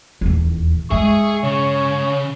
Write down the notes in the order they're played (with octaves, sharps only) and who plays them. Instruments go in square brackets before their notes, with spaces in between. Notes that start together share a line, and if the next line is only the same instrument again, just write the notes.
[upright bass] D#1 E2
[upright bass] G2 G#3 [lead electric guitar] G#4 G#5 [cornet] E5 [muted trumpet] C#6
[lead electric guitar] C#3 [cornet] C#5